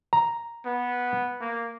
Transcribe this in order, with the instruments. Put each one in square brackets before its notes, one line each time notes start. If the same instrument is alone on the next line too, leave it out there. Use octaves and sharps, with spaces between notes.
[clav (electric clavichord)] A#5
[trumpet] B3
A#3